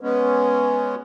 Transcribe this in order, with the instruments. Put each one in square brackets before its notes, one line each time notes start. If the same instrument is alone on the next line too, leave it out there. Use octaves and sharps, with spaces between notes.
[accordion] G#3 B3 C#4